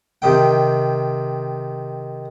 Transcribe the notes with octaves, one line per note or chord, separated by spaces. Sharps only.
C3 D#3 G5